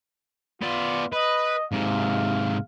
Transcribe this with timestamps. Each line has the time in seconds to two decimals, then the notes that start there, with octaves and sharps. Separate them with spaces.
0.62 B3 F4 D5
1.13 B4 D#5
1.72 G#2 C3 F5